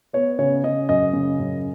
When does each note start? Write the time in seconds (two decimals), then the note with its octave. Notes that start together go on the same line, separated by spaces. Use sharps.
0.13 B3 C#5
0.39 C#3 C#5
0.64 C#3 D#5
0.89 F#2 D#5
1.13 C#3
1.39 F#2